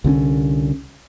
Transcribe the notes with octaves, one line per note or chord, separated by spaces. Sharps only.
C2 D3 C4 C#4